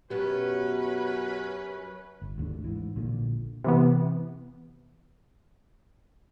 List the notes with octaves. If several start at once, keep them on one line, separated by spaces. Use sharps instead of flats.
F#2 B2 F#3 B3 C#4 G4 B4
G1
G#1 D#2 A3 D4
G#2 E3
A#1 A#2 D3
C3 E3 B3